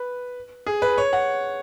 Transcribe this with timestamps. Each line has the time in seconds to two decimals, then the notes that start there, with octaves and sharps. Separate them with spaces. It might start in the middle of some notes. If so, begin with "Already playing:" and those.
Already playing: B4
0.67 G#4
0.82 B4
0.98 C#5
1.13 F#5